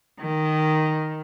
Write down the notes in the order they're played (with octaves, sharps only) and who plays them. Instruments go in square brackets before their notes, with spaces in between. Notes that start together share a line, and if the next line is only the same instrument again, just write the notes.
[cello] D#3